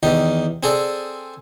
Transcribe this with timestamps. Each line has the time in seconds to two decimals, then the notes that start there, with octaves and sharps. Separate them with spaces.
0.03 E2 D#3 G4
0.63 C4 G#4 A4 D5